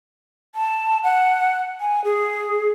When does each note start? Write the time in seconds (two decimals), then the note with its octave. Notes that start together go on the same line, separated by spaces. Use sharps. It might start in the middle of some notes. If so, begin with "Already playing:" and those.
0.55 A5
1.03 F#5
1.80 G#5
2.04 G#4